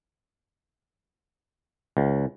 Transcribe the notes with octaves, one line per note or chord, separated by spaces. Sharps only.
C#2